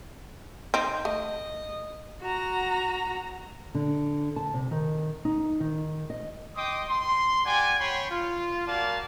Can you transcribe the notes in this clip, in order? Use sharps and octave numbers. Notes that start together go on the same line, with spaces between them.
C4 D#4
A3 D#5
F#4 A#5
D3
A5
C3
D#3
D#4
D#3
D#5
D#5 G5 C6 D6 D#6
C6
G4 D5 F#5 G#5
C#5 G5 B5 C6
F4
A#3 F#4 A#4 D5 F5 A5